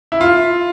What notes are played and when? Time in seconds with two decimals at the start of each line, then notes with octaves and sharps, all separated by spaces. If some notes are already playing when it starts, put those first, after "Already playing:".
0.12 E4
0.21 F4